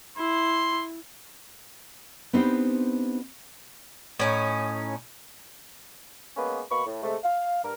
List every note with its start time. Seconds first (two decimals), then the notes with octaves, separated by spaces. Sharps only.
0.18 E4 C6
2.33 B3 C4 D4 D#4 G4 C5
4.20 A2 C#4 D#4
6.36 G#3 A#3 B3 C#4 B4
6.70 B2 A#3 B5 C#6
6.86 A2
7.03 C3 G#3 A3
7.23 F5
7.63 G2 A#4